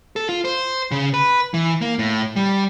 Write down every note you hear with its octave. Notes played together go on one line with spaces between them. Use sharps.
A4
F4
C5
C#3
B4
E3
A#3
A2
G3